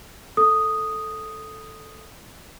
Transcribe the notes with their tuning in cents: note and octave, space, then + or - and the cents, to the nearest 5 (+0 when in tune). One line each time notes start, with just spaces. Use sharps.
A4 +0 D#6 +0